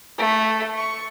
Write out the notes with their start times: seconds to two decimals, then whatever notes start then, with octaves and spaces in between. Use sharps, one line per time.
0.18 A3
0.77 C#6